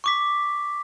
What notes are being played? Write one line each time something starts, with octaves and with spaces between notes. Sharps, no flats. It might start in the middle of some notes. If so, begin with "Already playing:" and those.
C#6 D6 B6